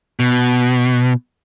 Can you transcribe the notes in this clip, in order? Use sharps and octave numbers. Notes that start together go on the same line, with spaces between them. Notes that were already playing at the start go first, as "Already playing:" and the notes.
B2